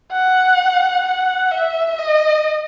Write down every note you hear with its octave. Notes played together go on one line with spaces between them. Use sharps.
F#5
F#5
E5
D#5